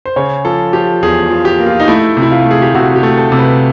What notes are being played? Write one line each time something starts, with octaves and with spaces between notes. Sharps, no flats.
C5
C#3 C#5
F3 A4
F3 G4
E2 G#4
F3
G4
A#3
F4
D#4
A3 E4
C3
E4
F4
A3
G#4
G4
C3 F#4
G4
A3
A4
C3
B4